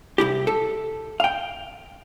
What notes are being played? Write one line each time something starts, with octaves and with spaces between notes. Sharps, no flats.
C2 E4 G4
A4
F5 G5